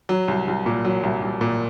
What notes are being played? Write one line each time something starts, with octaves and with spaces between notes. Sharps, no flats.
F#3
C2
C2
A#2
F#3
C2
C2
A#2